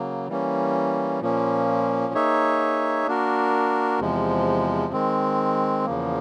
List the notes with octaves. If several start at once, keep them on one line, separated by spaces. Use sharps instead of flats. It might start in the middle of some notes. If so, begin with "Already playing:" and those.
Already playing: C#3 F#3 A#3
E3 G3 A#3 C#4
A#2 F3 A#3 C#4
A#3 D#4 G#4 C#5 E5
A#3 D4 F#4 A#4
E2 C3 F3 G#3
D#3 G#3 C4
E2 C#3 F3 A#3